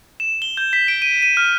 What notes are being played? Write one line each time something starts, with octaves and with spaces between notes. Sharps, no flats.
E7
G7
G6
B6
D7
D#7
D#7
F6